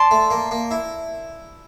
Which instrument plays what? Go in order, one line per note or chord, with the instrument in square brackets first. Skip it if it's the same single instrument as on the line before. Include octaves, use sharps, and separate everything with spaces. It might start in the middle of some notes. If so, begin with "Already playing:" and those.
Already playing: [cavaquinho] D5 A5 C6
[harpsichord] A3
A#3
A#3
E4